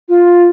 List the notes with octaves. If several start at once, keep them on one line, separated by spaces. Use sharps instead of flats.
F4